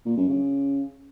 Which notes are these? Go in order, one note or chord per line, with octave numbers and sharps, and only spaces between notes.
A#2
F#2
C#3